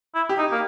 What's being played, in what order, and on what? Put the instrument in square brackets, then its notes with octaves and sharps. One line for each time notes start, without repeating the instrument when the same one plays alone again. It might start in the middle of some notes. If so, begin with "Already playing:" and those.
[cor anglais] E4
[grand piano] G4
[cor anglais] D#4
A#3